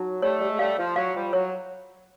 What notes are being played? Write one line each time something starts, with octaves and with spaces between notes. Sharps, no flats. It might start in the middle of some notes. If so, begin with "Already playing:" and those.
Already playing: F#3 D#4
G3 A3 C#5
G3
G#3
G3 A3 F5
F3
F#3 F5
F3 G3
F#3 C#5